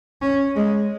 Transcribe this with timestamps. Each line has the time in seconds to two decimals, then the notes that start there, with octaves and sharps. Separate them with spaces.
0.22 C#4
0.56 G#3